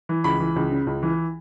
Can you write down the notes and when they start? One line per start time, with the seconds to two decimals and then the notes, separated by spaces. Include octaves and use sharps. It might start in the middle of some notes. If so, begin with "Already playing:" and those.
0.09 E3
0.24 C#2 B5
0.40 E3
0.56 C#2
0.72 C#3
0.87 C#2
1.03 E3